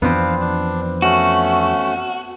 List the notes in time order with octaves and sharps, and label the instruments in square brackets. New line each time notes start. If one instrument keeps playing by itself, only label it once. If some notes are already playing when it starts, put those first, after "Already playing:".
[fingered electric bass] F2 E3 F3 [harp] B3 C4 [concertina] D4 F5
[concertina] D4
[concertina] A3 C#4 [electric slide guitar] F#4